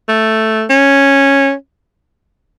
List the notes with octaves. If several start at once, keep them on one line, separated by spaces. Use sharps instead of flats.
A3
C#4